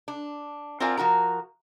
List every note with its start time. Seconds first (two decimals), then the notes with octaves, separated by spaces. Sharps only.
0.08 D4
0.80 C4 F4 F#4 A#4 D5 G#5
0.97 F3 F#4 A#4 A#5